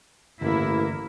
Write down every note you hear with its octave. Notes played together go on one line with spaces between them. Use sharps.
A1 G2 D3 D#3 A#3 E4